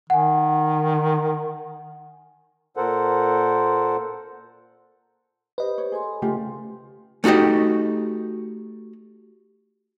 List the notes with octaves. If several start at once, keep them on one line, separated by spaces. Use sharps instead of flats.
D#3 F#5 G#5
A#2 A4 A#4 C5 F#5
G4 B4 C5 D#5
C#5
G#4 A4 G#5 C6
C#3 A3 F4 G4
A3 D#4 F#4 G4 D#5